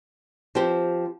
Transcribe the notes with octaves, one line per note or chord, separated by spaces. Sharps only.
F3 C4 G4 C5